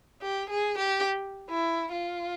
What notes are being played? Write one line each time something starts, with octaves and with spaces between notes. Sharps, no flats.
G4
G#4
G4
E4
F4